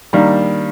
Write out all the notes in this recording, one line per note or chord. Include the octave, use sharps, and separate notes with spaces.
D#3 G3 A#3 D4